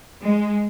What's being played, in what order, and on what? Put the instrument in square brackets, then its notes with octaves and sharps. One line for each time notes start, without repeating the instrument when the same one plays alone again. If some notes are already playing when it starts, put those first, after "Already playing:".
[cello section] G#3